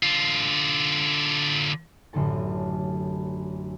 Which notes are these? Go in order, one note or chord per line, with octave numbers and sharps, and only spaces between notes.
D3 F4
A1 F#2 D3 A4 A5